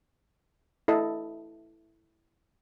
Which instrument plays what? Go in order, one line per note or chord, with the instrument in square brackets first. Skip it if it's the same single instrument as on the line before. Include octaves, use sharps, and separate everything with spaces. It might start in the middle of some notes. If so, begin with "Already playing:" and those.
[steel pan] E4 A4 D#5